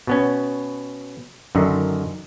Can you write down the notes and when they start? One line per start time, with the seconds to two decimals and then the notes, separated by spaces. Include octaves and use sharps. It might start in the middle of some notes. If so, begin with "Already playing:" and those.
0.07 B2 B3 C#4
1.55 F#2 D3 D#3